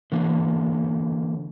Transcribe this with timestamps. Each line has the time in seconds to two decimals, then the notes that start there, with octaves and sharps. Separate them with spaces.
0.12 D3 E3 A#3